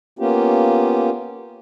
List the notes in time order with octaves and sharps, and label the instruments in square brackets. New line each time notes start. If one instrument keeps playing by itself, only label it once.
[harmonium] A#3 B3 C#4 F4 G4